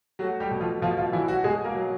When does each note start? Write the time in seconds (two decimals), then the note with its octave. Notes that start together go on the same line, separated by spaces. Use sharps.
0.19 F#3 A3 F#4
0.40 G3 G4
0.51 B2
0.61 F3 F4
0.81 B2 F3 F4
0.97 F3 F4
1.12 E3 F#3 E4
1.28 F#3 F#4
1.44 B2 G#3 G#4
1.64 A#3 A#4
1.75 F#3